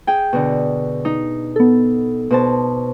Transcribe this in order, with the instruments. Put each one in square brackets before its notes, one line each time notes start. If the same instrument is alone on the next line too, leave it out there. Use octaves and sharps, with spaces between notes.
[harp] G#4 G5
B2 D3
D#4
[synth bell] B3 A4
[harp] B2 C5 A5